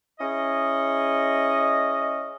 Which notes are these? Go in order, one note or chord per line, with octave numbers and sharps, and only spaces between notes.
C#4 E4 G#4 D#5